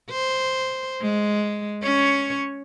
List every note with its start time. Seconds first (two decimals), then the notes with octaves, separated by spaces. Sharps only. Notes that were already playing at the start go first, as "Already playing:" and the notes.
0.10 C5
1.01 G#3
1.83 C#4 C#5